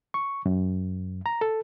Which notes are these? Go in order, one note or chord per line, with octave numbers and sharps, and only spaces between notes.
C#6
F#2
A#5
A4